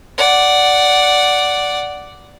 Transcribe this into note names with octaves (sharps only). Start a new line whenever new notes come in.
D5 F#5